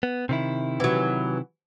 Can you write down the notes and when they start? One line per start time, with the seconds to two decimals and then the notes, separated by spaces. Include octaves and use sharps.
0.03 B3
0.29 C3 D#3 E4
0.80 E3 F#3